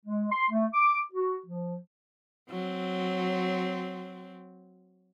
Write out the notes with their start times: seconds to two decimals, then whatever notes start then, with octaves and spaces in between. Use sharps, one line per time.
0.05 G#3
0.31 C6
0.50 A3
0.73 D6
1.12 F#4
1.46 F3
2.50 F#3 C4